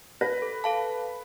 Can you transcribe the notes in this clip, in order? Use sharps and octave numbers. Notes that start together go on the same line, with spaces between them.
B4 A#6
A4
A4 F5 A5